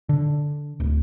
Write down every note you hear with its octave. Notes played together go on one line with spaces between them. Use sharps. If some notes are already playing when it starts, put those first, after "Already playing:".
D3
D1